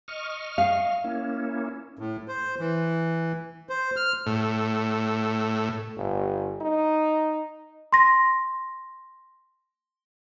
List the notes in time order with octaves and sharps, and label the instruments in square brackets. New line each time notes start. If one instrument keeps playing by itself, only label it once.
[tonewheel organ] D#5 C#6 F6
[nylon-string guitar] F5
[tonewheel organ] A#3 C#4 E4
[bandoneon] A2
C5
E3
C5
F6
[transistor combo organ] A2
[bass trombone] G1
D#4
[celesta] C6 A#6